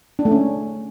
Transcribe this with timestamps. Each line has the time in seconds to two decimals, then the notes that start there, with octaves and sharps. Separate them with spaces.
0.19 D4
0.25 A3
0.32 C#4